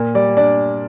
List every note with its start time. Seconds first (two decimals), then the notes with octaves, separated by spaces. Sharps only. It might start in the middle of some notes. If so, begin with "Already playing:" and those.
Already playing: A#2 A#3
0.14 G3 D5
0.37 D4 D5